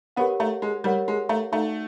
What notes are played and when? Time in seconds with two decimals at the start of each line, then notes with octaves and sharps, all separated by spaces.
0.17 B3 G4 A#4 C#5 F#5
0.40 A3
0.62 G#3
0.84 G3 G4 A#4 C#5 F#5
1.08 G#3
1.29 A3
1.52 A3 D#4 F#4 A4 D5 F#5